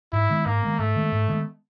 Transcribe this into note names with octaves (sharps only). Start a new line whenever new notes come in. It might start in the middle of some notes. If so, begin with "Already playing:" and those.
G#2 E4
D#3 G#3 B3
G#2 A#3
D#3 G#3 B3
G#2 A3
D#3 G#3 B3
G#2
D#3 G#3 B3